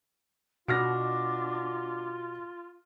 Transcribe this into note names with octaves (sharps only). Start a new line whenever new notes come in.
B2 D4 F4 F#4 F6 A#6